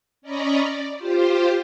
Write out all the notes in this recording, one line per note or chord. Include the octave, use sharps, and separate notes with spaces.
C#4 D5 D#5 A#5 B5 C#6
D5
F4 G4 C5